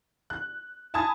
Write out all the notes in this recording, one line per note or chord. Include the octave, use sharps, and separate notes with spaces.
F#6
G#5 A5 B5 D#6 G#6